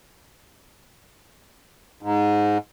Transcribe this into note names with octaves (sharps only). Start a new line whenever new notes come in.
G#2